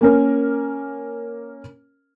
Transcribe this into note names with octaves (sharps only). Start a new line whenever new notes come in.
A#3 C#4 A#4